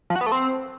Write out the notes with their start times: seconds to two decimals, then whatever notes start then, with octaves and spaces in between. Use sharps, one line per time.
0.10 F3
0.16 F#4
0.21 B3
0.26 A3
0.32 C4